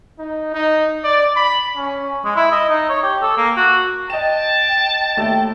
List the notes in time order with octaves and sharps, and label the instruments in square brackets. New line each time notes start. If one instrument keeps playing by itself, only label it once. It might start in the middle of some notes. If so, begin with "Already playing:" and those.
[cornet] D#4
D#4
D5
B5
C#4
[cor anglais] G#3
E4
D#5
D#4
C#5
G4
A4
A#3
F#4
[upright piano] D#5 E7 [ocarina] G5 [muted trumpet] A5
[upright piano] D#2 A3 A6 [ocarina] G5